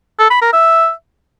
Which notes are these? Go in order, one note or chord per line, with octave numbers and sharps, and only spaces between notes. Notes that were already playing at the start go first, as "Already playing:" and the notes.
A4
B5
A#4
E5